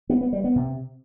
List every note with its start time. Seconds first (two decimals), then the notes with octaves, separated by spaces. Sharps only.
0.10 B3
0.21 B3
0.33 G3
0.44 B3
0.56 C3